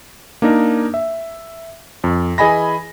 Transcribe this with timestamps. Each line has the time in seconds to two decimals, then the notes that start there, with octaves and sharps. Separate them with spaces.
0.42 A#3 D4 D#4 A#4
0.94 E5
2.04 F2
2.38 E3 G#4 D#5 G#5 B5 A#6